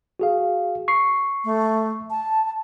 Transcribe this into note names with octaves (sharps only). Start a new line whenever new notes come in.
F#4 G#4 F5
C#6 C7
A3
A5